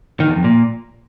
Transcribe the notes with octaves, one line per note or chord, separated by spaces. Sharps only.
D#3
E2
F2
A#2